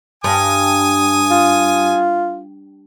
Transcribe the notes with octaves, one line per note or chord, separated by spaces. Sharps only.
G2 G#5 D#6
F4